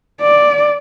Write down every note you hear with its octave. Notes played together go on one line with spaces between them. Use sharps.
D5